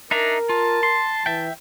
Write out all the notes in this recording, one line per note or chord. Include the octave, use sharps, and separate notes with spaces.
D4 D#4 A#4 E5 A#5
F4 A5
C6
E3 E5 G5